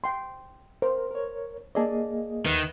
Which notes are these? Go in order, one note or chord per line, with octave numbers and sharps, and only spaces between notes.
G5 C6
A#4 C5
A#4 C#5
A#3 G#4 D5 D#5 A5
D#2 D#3 B4 F#6